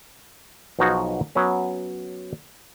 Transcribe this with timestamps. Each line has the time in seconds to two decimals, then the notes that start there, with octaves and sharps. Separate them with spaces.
0.79 B1 B2 F3 D#4 F#4 G#4
1.35 F#3 B3 C#4